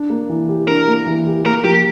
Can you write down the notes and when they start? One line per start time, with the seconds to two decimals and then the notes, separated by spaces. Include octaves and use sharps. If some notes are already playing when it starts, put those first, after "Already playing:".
Already playing: D4
0.10 A#3
0.30 E3
0.49 G4
0.68 D4 A#4
0.88 A#3
1.07 E3
1.26 G4
1.46 A#3 A#4
1.64 F3 G4